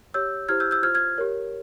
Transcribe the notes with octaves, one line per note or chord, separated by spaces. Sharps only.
G4 C#5 E6 G6
E4 G4 C5 F6 G#6
E6 G6
E6 G6
F4 C5 F6 G#6
F6 G#6
G4 A#4 C#5